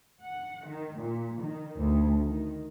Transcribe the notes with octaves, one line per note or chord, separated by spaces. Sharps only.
F#5
D#3
A#2
D#3
D2
D#3